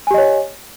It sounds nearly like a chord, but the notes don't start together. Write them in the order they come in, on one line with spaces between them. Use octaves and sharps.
G#5 G4 D#5 C#5